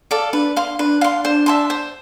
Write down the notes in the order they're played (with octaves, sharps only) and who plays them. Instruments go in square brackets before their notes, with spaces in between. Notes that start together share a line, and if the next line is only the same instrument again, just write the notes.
[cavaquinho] A4 D5 F5
[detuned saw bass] D4 [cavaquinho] B4
[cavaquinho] F5 C6
[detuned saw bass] D4 [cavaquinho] B4
[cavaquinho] F5 C6
C5
E5 A5 C6
C5